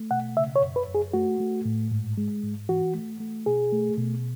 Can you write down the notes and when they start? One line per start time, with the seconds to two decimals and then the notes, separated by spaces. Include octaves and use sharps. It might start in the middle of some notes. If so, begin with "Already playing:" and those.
Already playing: A3
0.11 B2 F#5
0.37 C#3 E5
0.56 C#5
0.62 F#2
0.76 B4
0.88 F#2
0.95 G#4
1.13 A3 F#4
1.40 A3
1.65 A2
1.91 G#2
2.18 G#3
2.44 G#2
2.69 E3 F#4
2.94 A3
3.20 A3
3.46 B2 G#4
3.73 A3
3.98 B2